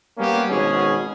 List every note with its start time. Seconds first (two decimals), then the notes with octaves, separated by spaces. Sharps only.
0.18 G3 A#3 B3 C#4 G4
0.49 G#1 B2 C#4 G#4